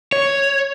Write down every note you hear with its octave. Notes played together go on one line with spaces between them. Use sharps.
C#5